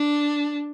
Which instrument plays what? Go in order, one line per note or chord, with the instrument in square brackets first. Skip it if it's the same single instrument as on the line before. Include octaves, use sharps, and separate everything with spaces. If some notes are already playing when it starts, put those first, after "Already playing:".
Already playing: [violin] D4